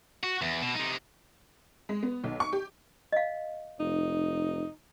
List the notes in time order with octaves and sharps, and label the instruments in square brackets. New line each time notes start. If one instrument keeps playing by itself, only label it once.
[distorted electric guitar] F#4
E2
B2
C3 D#4
[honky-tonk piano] G#3
B3
B1
C#6
G4
[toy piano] D#5 F5
[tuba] F1 [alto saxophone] D#4